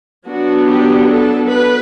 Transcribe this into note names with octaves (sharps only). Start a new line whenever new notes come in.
F#3 B3 D4 F#4
G4
A4
B4